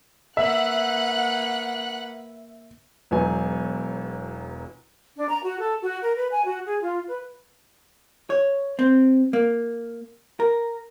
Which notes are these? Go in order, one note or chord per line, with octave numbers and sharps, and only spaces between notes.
A#3 B4 E5 F#5 F#6
E1 E2 F#3 B3 D#4 G#5
D4
A#5
F#4
A4
F#4
A#4
B4
G#5
F#4
G#4
F4
B4
C#5
C4
A#3
A#4